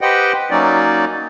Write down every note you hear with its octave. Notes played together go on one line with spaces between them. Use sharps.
G4 B4 C5 D#5 F#5 G5
F#3 A#3 C#4 D#4 D5